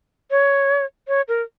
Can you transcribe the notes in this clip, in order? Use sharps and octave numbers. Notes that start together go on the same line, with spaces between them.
C#5
C#5
A#4